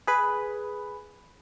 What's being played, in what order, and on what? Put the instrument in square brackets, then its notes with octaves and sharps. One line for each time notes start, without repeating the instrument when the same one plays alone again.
[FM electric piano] G#4 B4